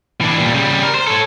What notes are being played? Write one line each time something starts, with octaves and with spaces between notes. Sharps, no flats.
E3 D4
A#2 G3
C#3 G3
A#4
C5
A4 C#5